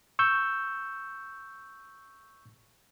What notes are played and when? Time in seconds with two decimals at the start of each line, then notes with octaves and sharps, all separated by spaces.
0.19 C#6 E6 G6